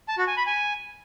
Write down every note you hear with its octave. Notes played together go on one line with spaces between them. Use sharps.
A5
F#4
G#5
B5
G#5